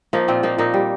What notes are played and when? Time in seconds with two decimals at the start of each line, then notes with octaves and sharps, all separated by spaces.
0.13 F3 A#3 D#4
0.28 A#2 C4 F4
0.43 F3 A#3 D#4
0.58 A#2 A#3 D#4
0.74 G3